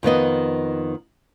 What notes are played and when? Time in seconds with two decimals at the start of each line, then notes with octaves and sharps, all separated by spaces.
0.03 F2 D#3 B3 D#5